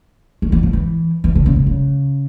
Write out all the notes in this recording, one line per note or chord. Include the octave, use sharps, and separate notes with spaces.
D#3
E3
F3
E3
E3
D3
C#3
C3
C#3